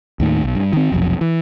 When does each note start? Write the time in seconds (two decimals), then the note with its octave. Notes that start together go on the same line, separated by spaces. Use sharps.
0.20 D#2 A2 D#3
0.44 B1
0.55 G2
0.73 D#3 C4
0.92 F1 B1 F2
1.21 E3